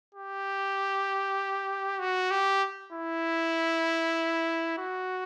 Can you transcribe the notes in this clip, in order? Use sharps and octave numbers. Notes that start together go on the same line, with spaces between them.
G4
F#4
G4
E4
F#4